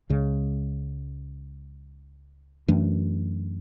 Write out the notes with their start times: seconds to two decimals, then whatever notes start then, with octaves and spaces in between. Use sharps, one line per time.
0.09 C#2 C#3 G#3
2.68 F#2 E3 A3 D4